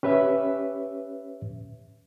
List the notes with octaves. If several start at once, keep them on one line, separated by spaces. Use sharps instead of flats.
C#4 G4 B4 C#5 E5